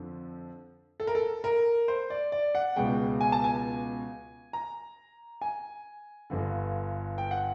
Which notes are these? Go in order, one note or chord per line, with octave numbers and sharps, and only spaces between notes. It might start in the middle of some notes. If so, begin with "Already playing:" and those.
Already playing: F2 D3 F3
A4
A#4
A4
A#4
C5
D5
D5
F#5
C#2 B2 G#3 G5
G#5
A5
G#5
A#5
G#5
G1 G2 D3
G5
F#5